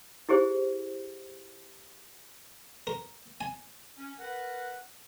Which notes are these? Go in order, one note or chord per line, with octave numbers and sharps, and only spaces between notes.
E4 G4 G#4 C5
A#4
G#5
C#4
A#4 B4 F#5